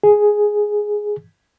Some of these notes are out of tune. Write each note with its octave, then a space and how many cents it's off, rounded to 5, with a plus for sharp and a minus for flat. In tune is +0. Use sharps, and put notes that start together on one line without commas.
G#4 +5